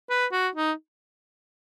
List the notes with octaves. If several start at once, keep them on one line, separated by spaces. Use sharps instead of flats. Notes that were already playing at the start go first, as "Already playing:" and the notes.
B4
F#4
D#4